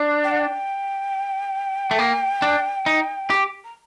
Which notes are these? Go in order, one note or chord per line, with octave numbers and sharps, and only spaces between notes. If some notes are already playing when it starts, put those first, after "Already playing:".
Already playing: D4
G5
F#5
G5
A3
A#3
D4
D#4
G4
A#5